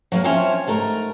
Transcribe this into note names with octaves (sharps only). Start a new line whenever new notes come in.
F#3 A3 A#3
F3 C4 C#4 F4 C#5 E5
G#2 A3 A#4 A#5